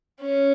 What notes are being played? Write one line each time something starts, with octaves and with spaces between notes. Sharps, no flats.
C#4